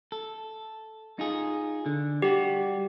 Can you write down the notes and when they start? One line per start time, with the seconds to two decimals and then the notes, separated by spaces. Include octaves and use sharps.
0.12 A4
1.19 D#4 F4 G#4
1.86 D3
2.22 G3 F#4 G4